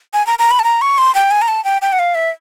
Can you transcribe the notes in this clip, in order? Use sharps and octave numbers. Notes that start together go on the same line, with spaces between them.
G#5
A#5
A#5
B5
A5
A#5
C#6
C6
G5
G#5
A#5
A5
G5
G5
F#5
F5
E5